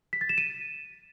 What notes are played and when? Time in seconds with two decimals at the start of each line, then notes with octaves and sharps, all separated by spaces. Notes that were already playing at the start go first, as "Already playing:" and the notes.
0.13 B6
0.21 A6
0.29 E7
0.38 D#7